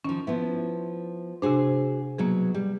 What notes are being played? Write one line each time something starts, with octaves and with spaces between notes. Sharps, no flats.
D#3 F3 C#4
F3 B3 E4
C3 D4 F#4 G#4 C5
B2 F#3 A#3 G#4
G3